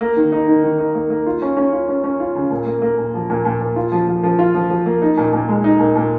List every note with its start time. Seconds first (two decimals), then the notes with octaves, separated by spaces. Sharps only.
0.01 A#3
0.17 D#3
0.32 D#4
0.47 D#3
0.64 D#3
0.78 D#4
0.95 A#3
1.10 A#3
1.26 F4
1.42 C#4
1.57 C#4
1.73 F4
1.89 C#4
2.04 C#4
2.20 F4
2.35 C#3
2.51 A#2
2.67 A#3
2.82 A#3
2.98 A#2
3.14 F3
3.30 A#2
3.45 A#2
3.60 A#2
3.76 F4
3.92 F3
4.07 F3
4.23 F3
4.39 F4
4.55 F3
4.70 F3
4.86 A#3
5.02 D#4
5.17 A#2
5.33 A#2
5.48 G#3
5.64 D#4
5.79 A#2
5.95 A#2